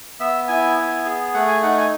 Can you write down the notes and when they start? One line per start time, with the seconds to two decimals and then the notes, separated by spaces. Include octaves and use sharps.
0.20 B3 E5
0.48 E4 G#5
0.77 B3
1.05 G#4
1.34 A3 F#5
1.48 G#5
1.63 D#4 F#5
1.77 G#5